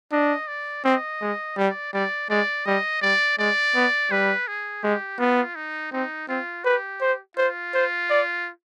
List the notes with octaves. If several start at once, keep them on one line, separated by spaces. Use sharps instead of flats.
D4 D#5
D5
C4 D#5
G#3
G3 D5
G3 D5
G#3 D5
G3 D#5
G3 D5
G#3 D5
B3
G3 B4
G#4
G#3 G4
B3 F4
D#4
C4 D#4
C4 F4
G4 B4
C5
F4 C5
C5
D5